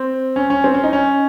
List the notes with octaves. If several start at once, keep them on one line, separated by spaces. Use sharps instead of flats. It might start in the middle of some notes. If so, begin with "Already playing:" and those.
Already playing: C4
C#4
C#4
C4
C#4
D#4
C#4